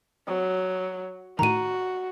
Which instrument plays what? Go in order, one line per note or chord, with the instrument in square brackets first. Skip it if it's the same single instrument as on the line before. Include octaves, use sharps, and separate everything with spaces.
[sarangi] F#3 [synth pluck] C4
[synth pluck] A2 D#3 [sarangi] F#4 [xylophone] A#5 D#7